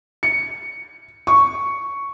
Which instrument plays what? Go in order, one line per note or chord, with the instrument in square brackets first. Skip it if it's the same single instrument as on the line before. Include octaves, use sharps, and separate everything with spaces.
[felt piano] C#7
C#6